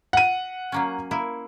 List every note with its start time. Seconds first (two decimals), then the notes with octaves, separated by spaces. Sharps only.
0.13 F#5 D#7
0.72 F#3 A#3 C#4
1.11 A#3 E4